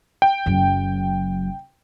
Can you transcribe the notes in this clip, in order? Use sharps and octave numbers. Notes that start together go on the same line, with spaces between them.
G5
F#1 F#3